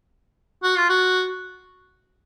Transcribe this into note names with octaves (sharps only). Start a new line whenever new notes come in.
F#4
F4
F#4